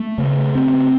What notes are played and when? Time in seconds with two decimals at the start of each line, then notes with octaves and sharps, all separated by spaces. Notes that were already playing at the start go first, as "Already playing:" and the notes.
Already playing: A3
0.18 C#3
0.55 C4